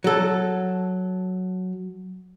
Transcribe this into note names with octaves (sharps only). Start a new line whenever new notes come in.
F#3 A4